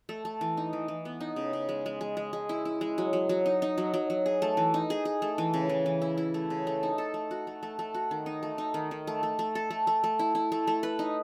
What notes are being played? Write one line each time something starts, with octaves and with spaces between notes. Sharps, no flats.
A3
A3
E3
D#4
E3
E3
B3
D#4
C#3
C#3
G#3
G#3
G#3
G#3
G#3
E4
E4
G#3
F#3
F#3
F#3
D#4
D#4
F#3
F#3
F#3
G#4
A3
E3
D#4
G#4
G#4
A3
E3
C#3
E3
E3
E4
E4
A3
C#3
A3
D#4
A4
A3
F#4
A3
A3
A3
F#4
D#3
D#4
A3
D#4
D#3
D#3
A3
A3
A3
A4
A3
A3
A3
E4
E4
A3
A3
B4
D#4